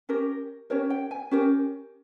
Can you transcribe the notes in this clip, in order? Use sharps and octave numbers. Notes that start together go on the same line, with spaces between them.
C#4 G4 A#4
C#4 G4 A#4 C#5
G5
G#5
C#4 G4 A#4